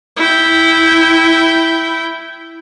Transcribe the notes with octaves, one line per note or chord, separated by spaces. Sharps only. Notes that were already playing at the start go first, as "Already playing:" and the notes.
E4 G5